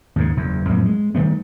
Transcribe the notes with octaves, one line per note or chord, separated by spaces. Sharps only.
D#2 G#2 C#3
F#1 E2
F2 A2 F#3 A#3
G#3
D#3 G3 A3 B3